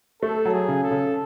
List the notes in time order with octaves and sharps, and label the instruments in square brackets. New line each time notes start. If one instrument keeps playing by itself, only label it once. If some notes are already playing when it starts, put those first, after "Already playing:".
[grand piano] A3 [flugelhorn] A4
[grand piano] F#3
[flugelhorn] G#4
[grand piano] C#3
[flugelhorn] A4
[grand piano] C#3